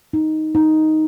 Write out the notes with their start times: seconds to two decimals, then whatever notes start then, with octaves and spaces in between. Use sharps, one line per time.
0.13 D#4
0.55 D#4